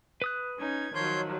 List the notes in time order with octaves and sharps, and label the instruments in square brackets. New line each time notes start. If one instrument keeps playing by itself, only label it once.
[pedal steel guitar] B4 D#6 F#6
[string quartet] C#4 D#4 G#6
[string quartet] D#3 F3 F#3 [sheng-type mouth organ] C#5 C6 G6